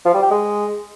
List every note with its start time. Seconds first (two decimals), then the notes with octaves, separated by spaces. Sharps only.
0.05 F3
0.14 G3
0.22 G4
0.31 G#3